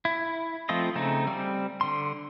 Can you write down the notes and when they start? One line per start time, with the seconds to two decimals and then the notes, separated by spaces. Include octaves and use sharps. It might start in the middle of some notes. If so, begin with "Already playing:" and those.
0.05 E4
0.69 F3 A3 C4 F4 D#5
0.95 C#3 A3 C4 D#4
1.27 G3 C4
1.81 D3 C6